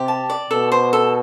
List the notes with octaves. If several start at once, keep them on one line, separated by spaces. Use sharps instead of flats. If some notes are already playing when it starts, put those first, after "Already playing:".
Already playing: C3 G4
A5
D5
B2 A4
C5
A4